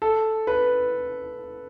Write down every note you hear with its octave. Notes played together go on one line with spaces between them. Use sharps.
A4
B4